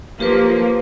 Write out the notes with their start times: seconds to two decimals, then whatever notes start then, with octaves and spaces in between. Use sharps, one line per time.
0.20 F3 A#3 G4 B4